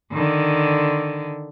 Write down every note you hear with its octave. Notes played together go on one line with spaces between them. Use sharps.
D3 D#3